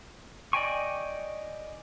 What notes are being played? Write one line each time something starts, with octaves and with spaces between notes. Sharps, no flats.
D5 D#5 G5 G#5 C#6